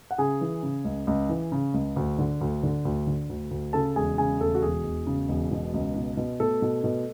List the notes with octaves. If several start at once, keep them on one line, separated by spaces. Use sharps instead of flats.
F#5
C#3 G#4 G#5
E3
C#3
C#2
C#2
E3
C#3
C#2
D2
D3
D2
D3
D2
D3
D2
D2
C#3 A4 A5
E1 G#4 G#5
C#3 G#4 G#5
E1 A3 A4
F#4
E1 G#4
E1
C#3
E1
B2
C#2
B2
B2
B2 A3 A4
B2
B2